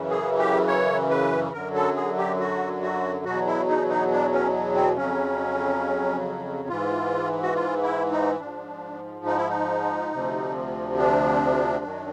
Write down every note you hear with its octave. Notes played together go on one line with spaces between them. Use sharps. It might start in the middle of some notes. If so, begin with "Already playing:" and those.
Already playing: F#2 C#3 E3
G#4
G4
C#5
B4
F#2 D3 F#3 A#4
A4
G#4
G4
F#4
F#4
E2 B2 F#3 F#4
E4
D#4
D#4
D4
C#4
C4
F2 C#3 F#3 C#4
G#2 E3 F4
F#4
F4
E4
D#4
G#2 F3 D4
D#4
E4
D#4
D2 C3 F3
D4
F#2 D#3 F#3